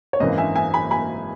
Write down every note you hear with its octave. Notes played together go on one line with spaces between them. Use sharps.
C#5
G#1 F#2 E3 A#3 D#5
E5 G#5
E5 G#5
G#5 B5
G#5 B5